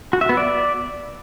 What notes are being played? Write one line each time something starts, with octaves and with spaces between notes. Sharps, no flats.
F#4
E5
B3
D5